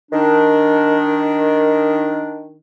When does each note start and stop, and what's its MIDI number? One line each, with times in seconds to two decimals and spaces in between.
0.12 2.57 51
0.12 2.57 62